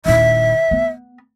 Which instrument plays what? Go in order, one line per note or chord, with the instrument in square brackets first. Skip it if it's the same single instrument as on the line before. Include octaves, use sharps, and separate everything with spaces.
[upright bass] D#1 E4 [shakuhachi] E5
[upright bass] B3